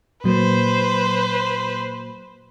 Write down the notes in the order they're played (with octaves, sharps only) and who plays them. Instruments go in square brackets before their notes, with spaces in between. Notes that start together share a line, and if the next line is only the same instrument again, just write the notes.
[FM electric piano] A#2 F#3 A#3 [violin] B4 C5